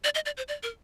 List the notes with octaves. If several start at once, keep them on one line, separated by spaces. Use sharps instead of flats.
D5
D#5
D5
C5
D5
A#4